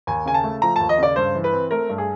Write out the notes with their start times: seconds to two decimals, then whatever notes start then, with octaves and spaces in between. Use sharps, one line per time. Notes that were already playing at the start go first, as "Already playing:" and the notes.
0.07 D#2 G#5
0.26 C#3 G#5
0.34 A5
0.44 A3
0.62 F3 A#5
0.76 D#2 A5
0.89 D#5
0.98 C#3 D5
1.16 G2 C5
1.35 E3
1.44 B4
1.53 C4
1.71 A3 A#4
1.89 G2
1.98 G#4